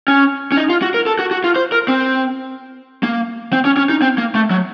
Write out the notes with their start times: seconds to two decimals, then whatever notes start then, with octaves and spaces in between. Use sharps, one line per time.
0.08 C#4
0.52 C#4
0.57 D#4
0.70 F4
0.82 F#4
0.94 A#4
1.06 A4
1.19 F#4
1.31 F#4
1.44 F4
1.56 C5
1.72 A#4
1.88 C4
3.03 A#3
3.53 C4
3.65 C#4
3.77 C#4
3.89 D#4
4.02 C4
4.18 A#3
4.35 A3
4.50 F#3